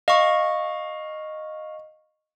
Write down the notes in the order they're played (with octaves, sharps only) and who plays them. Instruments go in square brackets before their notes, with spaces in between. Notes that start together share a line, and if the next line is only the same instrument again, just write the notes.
[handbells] D#5 C#6 [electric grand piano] F5